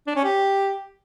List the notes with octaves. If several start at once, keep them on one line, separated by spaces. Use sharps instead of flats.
D4
C#4
G4